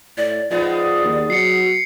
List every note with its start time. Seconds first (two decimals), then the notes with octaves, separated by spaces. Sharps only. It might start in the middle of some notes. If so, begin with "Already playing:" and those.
0.18 A2 D5
0.51 F3 G#3 B3 D#4 D5
1.05 D#2
1.30 F#3 C7 C#7